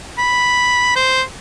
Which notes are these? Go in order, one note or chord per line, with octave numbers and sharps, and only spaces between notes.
B5
C5